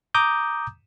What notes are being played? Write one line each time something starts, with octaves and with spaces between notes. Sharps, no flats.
A#5 D6 D#6 G6